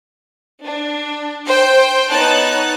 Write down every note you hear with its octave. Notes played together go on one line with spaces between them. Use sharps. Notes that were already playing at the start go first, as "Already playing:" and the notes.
D4
C5 G5 G6
B3 D#4 C#5 A5 F#6